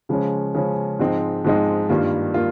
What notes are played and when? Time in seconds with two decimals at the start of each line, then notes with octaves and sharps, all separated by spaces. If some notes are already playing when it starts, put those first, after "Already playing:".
0.09 C#3 F3 G#3 C#4
0.54 C#3 F3 G#3 C#4
0.99 G#2 F3 G#3 C4 D#4
1.44 G#2 F3 G#3 C4 D#4
1.89 G2 D#3 G3 A#3 F4
2.34 A#3 F4